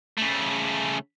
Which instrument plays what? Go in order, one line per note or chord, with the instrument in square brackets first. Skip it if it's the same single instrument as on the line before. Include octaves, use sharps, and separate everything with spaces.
[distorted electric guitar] C#3 A3